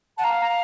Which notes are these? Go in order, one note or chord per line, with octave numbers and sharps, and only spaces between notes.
F#5 A5
F5 A#5
A#5